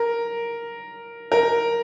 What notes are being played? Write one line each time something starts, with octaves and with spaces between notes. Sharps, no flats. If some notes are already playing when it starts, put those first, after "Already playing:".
Already playing: A#4
A#4